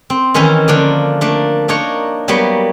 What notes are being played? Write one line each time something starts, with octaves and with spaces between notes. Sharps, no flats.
C4
D#3 E3 C#4 D#4 E4
D3 F3 A#3 D4
A3 A#3 D4
A#3 D4 D#4 C#5
F#3 G3 A#3 B3 C#5